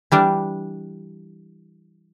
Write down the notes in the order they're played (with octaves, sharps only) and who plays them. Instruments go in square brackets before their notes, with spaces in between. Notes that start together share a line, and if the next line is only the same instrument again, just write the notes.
[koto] E3 G3 D4